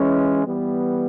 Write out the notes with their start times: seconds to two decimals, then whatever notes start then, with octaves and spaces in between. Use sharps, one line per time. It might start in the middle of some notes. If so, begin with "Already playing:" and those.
Already playing: E3 G#3 C#4
0.46 E3 G3 B3